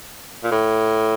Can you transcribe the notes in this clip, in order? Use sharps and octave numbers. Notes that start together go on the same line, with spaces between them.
A#2
A2